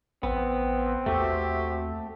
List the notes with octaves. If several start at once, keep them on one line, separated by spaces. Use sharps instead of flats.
A1 B3 C4
D#2 A3 F#4 G4 E5